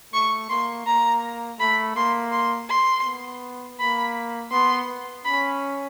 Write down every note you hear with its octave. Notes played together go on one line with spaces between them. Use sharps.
A3 C#6
A#3 C6
A#3 A#5
A3 B5
A#3 C6
C6
C6
B3
A#3 B5
B3 C6
C#4 B5